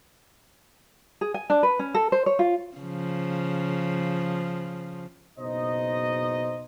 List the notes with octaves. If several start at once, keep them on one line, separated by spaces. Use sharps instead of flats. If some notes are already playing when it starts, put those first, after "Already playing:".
G#4
G#5
D4
B4
C#4
A4
C5
C#5
F4
C#3 F3
F#1 B2 D#4 C5 D#5